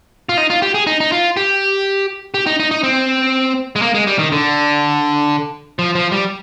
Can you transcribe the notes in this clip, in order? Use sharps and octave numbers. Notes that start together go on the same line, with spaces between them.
F4
D#4
F4
G4
G#4
D#4
D#4
F4
G4
G4
D#4
D#4
D#4
C4
G#3
A#3
G#3
G3
D#3
D3
F3
F3
G3